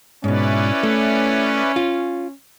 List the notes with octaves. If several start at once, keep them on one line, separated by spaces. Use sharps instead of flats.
G#2 B2 C#4 E4 B4 D5
A3
F4